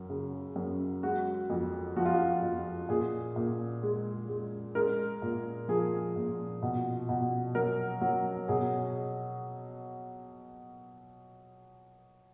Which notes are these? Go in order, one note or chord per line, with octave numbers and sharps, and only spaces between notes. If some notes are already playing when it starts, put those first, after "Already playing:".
Already playing: F#2
C#3
F#2
G#3 F#4
F2
F3 F#4
F4
F#4
F2
A#2 G#4
A#2
G#3
G#3
G#3 A#4
A#2
F3 G#4
A#2
B2
B2
F#3 A#4
F#3
B2 G#4